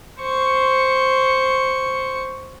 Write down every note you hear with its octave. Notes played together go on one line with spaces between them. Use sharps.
C5 C#6